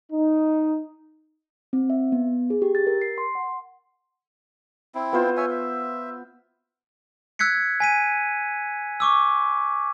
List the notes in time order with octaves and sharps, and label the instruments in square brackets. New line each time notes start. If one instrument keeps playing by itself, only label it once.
[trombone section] D#4
[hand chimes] C4
E5
B3
G#4
G4
A6
A#4
C7
C6
F#5
[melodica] C4 E4
[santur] B3 F4 C5
[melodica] C#5 E5 G#5
E5
[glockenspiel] E6 F#6 G#6 B6 C#7
G#5 B6 D#7
C#6 D6 E6